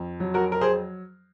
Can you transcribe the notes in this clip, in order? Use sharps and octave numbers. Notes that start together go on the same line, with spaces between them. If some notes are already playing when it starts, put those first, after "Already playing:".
Already playing: F2
F#3
F#4 A#4
A#4
G#4 C5